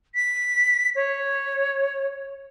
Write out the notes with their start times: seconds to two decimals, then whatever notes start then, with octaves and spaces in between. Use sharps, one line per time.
0.15 B6
0.95 C#5